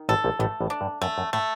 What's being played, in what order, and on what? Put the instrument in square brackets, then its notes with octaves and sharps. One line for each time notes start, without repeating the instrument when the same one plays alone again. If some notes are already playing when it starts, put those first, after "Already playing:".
Already playing: [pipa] D#3
[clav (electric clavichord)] A1 A2 [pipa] A4
[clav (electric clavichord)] A#1 A#2
[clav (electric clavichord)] A1 A2 [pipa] A3
[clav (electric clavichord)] A1 A2
[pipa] D4
[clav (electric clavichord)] G2
[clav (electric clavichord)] F#2 [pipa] A3
[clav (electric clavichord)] F#2
[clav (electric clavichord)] A2 [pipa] A3